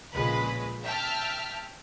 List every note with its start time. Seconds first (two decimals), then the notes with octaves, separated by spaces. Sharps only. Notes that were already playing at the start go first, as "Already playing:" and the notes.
0.13 A#1 C#3 G#3 B4 B5
0.83 E5 G5 A5 F6